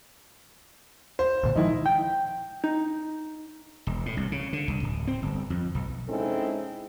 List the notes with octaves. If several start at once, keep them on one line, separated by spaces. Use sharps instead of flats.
C5
D2 A#2 D3
D#3 F3 G#3 D#4 E4
G5
D#4
E1
A2
C2
C#3
D3
C2
D1
C4
G1
F2
B1
G#3 C4 C#4 D#4 E4 A4